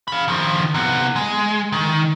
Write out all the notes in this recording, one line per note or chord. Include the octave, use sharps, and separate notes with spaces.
F5 B5
D#3 F3
C3 B3
G#3
D#3